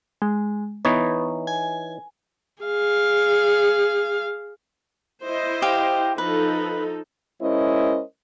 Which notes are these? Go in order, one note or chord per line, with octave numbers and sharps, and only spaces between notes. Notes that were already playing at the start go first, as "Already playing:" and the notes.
G#3
E3 B3 D#4 C#5
G#5
G#4 F5
E4 C5 D#5
G4 F5 G5
F3 D#4 A4 B4
G#3 C#4 E4 A#4 C5 D#5